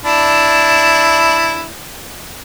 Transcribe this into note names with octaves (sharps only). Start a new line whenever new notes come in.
D4 E4